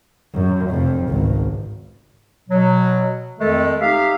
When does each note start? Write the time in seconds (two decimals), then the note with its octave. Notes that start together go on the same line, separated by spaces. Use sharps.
0.33 F#2
0.70 F1 F2
1.09 G#1 C#2
2.49 B2 F#3
3.39 F2 D#3 G#3 A3 A4
3.81 D#4 G4 E5 F5